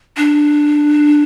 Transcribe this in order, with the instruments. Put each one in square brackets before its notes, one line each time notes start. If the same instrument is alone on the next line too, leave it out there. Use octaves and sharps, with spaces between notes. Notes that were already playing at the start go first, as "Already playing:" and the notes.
[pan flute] D4